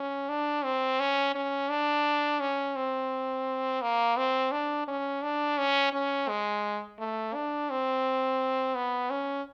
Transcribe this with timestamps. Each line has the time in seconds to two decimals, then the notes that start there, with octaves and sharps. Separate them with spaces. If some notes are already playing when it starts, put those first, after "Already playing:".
Already playing: C#4
0.29 D4
0.64 C4
1.00 C#4
1.35 C#4
1.69 D4
2.41 C#4
2.76 C4
3.82 A#3
4.17 C4
4.52 D4
4.88 C#4
5.23 D4
5.58 C#4
5.93 C#4
6.29 G#3
6.99 A3
7.34 D4
7.70 C4
8.75 B3
9.11 C#4